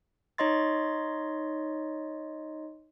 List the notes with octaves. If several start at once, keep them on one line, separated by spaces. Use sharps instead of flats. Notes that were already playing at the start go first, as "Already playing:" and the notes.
D#4 C#5 D#5 C6 A6